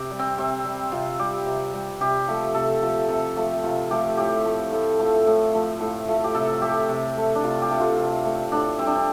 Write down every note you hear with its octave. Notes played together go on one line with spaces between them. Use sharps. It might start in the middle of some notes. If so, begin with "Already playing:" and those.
Already playing: C3 G4
G3
C4
C3 C4
G3
C3 F4
G3 G4
C3
G3
C3 G4
F3 A3
C3 A4
F3 A3
C3 A4
F3 A3
C3 F4
F3 A3 G4
A2 G4
F3 A3
A2
F3 A3
A2
F3 A3
A2
F3 A3
G4
C3 A4
A3 G4
C3
A3
D4
C3 F4
G4
A3
F4
C3
A3
A2 D4
G3 C4
D4
C4